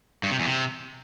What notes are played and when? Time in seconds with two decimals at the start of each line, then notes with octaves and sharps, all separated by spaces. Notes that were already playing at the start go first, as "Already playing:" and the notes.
0.23 G2
0.31 C3
0.39 E2
0.46 C3